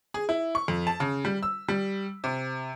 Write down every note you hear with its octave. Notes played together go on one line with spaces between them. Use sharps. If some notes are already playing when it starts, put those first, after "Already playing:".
G#4
E4
C#6
F2
A5
C#3
G3
E6
G3
C3